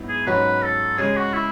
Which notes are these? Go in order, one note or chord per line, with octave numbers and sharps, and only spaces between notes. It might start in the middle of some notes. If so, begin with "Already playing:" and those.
Already playing: G#2 F#3 B3 E4
G#4
G#2 F#3 C#4 F#4 B4
A4
C#3 G#3 C#4 G#4
F#4
E4